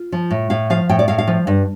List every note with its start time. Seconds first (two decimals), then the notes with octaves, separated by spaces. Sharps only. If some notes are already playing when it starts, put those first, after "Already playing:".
Already playing: F4
0.12 F3
0.31 A2
0.50 A2 F5
0.70 F3 F5
0.89 A2 G5
0.99 D5
1.08 A2 F5
1.18 F5
1.28 F3
1.47 G2